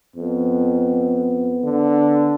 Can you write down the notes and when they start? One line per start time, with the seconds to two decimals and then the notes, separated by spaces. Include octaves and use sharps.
0.16 F2 B3
1.64 D3